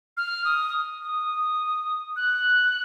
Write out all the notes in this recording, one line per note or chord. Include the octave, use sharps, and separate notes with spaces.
F6
D#6
D#6
F#6